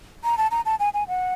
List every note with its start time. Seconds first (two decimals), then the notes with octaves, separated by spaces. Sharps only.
0.24 A#5
0.37 A5
0.51 A#5
0.66 A5
0.79 G#5
0.94 G#5
1.08 F#5